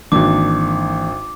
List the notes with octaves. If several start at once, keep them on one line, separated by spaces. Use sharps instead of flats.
G#1 D#3 E3 A#3 D4 D6